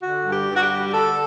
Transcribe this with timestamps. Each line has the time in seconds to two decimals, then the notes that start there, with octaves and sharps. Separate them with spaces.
0.03 D3 F#4
0.26 G2
0.33 G4
0.48 G2
0.56 F#4
0.63 G4
0.70 G3
0.93 D3 A4